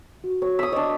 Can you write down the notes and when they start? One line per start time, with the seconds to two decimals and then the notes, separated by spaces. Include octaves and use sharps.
0.24 F#4
0.42 F#4 C#5
0.59 D#6 E6 B6
0.72 D4 C#5 D#5